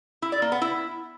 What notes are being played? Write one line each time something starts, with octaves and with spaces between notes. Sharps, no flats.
E4
D5
A#3
B3
E4